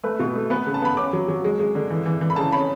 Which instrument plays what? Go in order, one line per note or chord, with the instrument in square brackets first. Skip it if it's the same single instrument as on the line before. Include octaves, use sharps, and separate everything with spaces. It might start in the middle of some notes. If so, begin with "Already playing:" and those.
[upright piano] A3 B4
B2
A3
B3 B4
C#3
A5
B3 B5
C#4 D6
F#3
F#3
G#3
G#3
D3
E3
E3
E3
B5
C#3 A5
C#4 B5